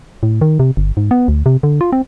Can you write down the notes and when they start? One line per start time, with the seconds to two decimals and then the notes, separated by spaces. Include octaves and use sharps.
0.23 A2
0.41 D#3
0.60 C3
0.77 G1
0.97 G#2
1.11 B3
1.28 D2
1.46 C3
1.63 D3
1.81 F4
1.92 C4